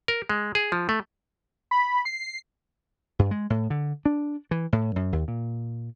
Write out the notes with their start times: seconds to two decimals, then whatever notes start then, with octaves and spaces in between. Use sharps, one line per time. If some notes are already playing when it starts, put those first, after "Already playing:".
0.08 A#4
0.30 G#3
0.55 G#4
0.72 F3
0.89 A3
1.71 B5
2.05 C7
3.19 G2
3.31 G#3
3.50 A2
3.70 D3
4.05 D4
4.51 E3
4.73 A2
4.96 F#2
5.13 D#2
5.28 A#2